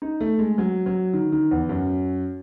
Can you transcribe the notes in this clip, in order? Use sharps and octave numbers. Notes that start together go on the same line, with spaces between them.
D#4
A3
G#3
F#3
F#3
D#3
D#3
E2
F#2